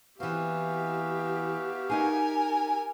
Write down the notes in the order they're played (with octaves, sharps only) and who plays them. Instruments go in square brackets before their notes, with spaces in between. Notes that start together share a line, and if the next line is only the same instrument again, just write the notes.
[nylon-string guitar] E3 C4 [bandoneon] B3 F#4 F5 [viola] G4 E5
[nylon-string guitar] D#4 G#4 [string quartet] A#4 G#5